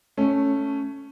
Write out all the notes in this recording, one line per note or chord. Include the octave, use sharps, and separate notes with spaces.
A3 C#4